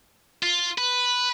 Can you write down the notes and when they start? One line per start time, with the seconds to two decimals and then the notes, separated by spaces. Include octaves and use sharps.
0.43 F4
0.78 B4